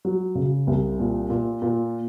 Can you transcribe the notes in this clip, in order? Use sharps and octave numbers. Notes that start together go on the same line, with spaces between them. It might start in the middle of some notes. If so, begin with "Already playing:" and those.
F#3
C#3
C2
A#2
A#2
A#2